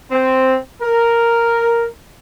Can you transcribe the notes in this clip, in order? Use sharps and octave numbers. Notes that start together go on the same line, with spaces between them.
C4
A#4